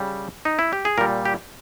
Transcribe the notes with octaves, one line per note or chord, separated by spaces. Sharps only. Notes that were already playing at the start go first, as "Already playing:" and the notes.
Already playing: C#3 G3
D#4
E4
G4
G#4
A#2 G3 A#4
G4